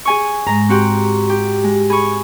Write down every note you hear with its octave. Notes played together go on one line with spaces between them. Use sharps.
G#4 G#5 C#6
G#2 G#3 A#5
C4 F#4 G4 C#6
G4
G#3
G#4 B5 C#6